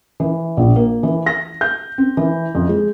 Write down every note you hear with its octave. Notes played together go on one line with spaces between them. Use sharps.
E3
A#1
A#3
E3
A#6
G6
C4
E3
F2
G#3